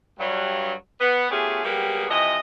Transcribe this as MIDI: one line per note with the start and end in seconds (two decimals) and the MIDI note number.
0.19 0.73 43
0.19 0.73 54
0.19 0.73 55
0.99 1.29 59
1.30 1.64 57
1.30 1.64 59
1.30 1.64 61
1.30 1.64 65
1.30 1.64 67
1.30 1.64 68
1.64 2.05 54
1.64 2.05 55
1.64 2.05 58
1.64 2.05 59
1.64 2.05 67
1.64 2.05 68
2.10 2.38 48
2.10 2.38 52
2.10 2.38 53
2.10 2.38 75